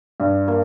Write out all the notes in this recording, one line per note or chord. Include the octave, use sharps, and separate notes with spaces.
G2
A#3